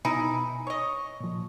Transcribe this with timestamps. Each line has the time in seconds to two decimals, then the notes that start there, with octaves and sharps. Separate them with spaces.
0.05 B2 D#4 E4 G#5 B5
0.67 C#5 D#5 C#6
1.20 A#2 F3